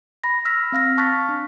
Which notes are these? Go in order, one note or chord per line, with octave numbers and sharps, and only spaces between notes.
B5 A#6
E6 F6 A#6 B6
C4 F5 F6 A#6
A5 C#6 F6 F#6 A6 B6
D4